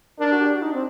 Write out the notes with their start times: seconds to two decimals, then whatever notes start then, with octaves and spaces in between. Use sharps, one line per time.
0.19 D4 A#4
0.32 F#4
0.40 G4
0.56 F#4
0.62 D#4
0.74 C4